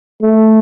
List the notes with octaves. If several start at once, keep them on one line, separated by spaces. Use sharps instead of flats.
A3